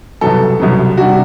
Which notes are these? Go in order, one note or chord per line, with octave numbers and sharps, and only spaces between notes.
C2 B2 F#3 B3 A4
C2 B2 F#3 B3
C3 G3 D4 F#4